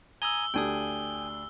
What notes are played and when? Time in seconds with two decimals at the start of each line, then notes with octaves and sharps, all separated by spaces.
0.22 G#5 A#5 D#6 E6 G7
0.54 D2 D4 G4 G5 G#5 D#6